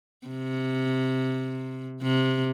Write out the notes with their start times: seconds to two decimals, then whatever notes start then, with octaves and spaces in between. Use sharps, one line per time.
0.27 C3
2.03 C3